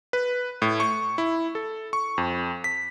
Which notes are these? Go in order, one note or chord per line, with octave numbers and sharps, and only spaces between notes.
B4
A2
C#6
E4
A4
C#6
F2
B6